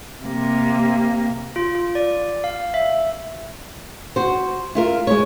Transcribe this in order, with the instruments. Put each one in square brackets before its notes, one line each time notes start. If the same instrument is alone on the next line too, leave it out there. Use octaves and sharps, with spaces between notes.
[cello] C3 A#3
[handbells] F4
F4
D5
F5
E5
[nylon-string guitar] F#4 C5
E4 F4 A#4
G#3 C#5